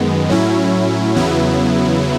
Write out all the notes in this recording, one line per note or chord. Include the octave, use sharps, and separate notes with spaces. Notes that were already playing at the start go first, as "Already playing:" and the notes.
Already playing: F#2 D#3 G#3 B3
A2 F#3 C#4 E4
E2 C#3 F#3 B3 E4